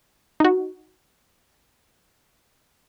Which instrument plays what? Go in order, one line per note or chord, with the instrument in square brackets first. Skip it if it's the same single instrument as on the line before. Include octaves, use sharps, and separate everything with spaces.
[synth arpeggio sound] D#4 F#4